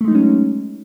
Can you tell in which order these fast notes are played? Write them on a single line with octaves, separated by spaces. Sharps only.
A3 G#3 D#4 F#3 C#4